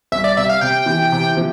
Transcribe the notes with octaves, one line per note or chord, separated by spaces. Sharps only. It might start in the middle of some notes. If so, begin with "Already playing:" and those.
C2 E5
D5
C3 E5
F5
C3 G5
E3
C3
F3